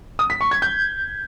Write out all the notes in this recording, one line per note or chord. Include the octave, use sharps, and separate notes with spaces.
D#6
B6
C#6
G#6
G6